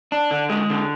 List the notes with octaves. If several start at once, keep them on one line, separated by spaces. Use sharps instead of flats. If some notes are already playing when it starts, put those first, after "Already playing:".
D4
D3
G#3
D3